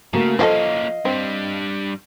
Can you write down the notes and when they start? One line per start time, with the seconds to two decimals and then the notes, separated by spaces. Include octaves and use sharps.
0.13 C#3 A3 A#3 F#4
0.39 F3 A#3 C#4 G4 A4 D#5 F5
1.05 G2 G3 C4